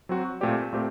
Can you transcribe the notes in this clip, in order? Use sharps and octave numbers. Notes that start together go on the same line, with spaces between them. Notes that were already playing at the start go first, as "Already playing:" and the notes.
F#3 C4 F#4
A#2 A3 C4 G4 D5
A#2 A3 C4 G4